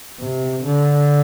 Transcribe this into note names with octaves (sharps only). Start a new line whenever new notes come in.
C3
D3